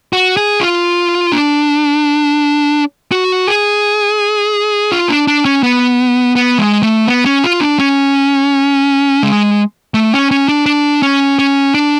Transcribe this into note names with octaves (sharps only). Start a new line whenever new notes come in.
F#4
G#4
F4
D4
F#4
G#4
F4
D4
D4
C#4
B3
B3
G#3
A3
B3
C#4
F4
D4
C#4
G#3
A3
C#4
C#4
D4
D4
C#4
C#4
D4